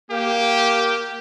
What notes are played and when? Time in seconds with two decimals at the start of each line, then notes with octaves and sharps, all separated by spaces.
0.11 A#3 G4